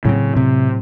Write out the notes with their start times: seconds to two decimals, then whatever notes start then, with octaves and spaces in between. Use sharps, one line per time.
0.05 A2 C#3 F#3 C4
0.37 C3